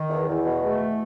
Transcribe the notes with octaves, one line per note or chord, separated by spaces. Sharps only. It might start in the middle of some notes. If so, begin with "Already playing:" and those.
Already playing: D#3
E2
E2
B2
A3